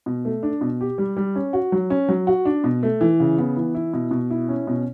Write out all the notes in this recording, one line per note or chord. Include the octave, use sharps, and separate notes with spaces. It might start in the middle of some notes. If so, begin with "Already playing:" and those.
B2
A3
D4
B2
G4
G3
G3
C#4
F#4
F#3
C#4
F#3
F#4
D4
B2
A3
E3
C#3
B3
E3
E4
B2
B2
E4
C#4
B2